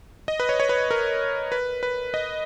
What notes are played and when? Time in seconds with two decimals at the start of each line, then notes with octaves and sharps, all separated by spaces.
0.28 D#5
0.40 B4
0.49 C#5
0.60 C#5
0.69 B4
0.91 A#4
1.52 B4
1.83 B4
2.14 D#5